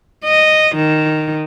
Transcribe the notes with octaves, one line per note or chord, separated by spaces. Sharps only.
D#5
D#3